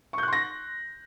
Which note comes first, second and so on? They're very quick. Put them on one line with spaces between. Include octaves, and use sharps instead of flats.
C#6 G6 F#6 C6 A#6